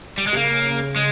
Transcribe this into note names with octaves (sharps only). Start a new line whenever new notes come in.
G3
G#3
C3
C#3 A#3
G#3